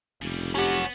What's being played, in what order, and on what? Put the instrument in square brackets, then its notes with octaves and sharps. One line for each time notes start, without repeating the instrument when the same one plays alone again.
[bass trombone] F1 [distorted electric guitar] C#3 G3
[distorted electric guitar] B3 [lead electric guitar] C#4 F#4 [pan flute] G4